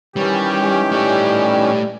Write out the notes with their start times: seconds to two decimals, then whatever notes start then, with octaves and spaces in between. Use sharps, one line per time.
0.16 D#3 E3 G3 C#4 G4
0.92 G3 A3 C#5